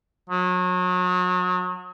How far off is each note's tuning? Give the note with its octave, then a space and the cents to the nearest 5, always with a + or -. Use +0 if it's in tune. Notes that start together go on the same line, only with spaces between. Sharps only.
F#3 -35